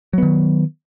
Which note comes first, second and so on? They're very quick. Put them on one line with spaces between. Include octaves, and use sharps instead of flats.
F#3 B3 D#3